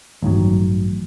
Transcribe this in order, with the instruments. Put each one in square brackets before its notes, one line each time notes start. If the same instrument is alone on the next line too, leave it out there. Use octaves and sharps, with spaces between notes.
[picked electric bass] A1 G2 D#3 F#3